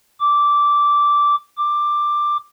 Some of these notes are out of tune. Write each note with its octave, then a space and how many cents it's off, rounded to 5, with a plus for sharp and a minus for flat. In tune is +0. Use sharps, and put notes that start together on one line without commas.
D6 -10
D6 +10